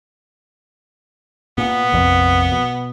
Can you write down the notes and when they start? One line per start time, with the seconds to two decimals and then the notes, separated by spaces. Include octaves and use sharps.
1.58 A#2 B3
1.92 F1 A#1 F2
2.52 B2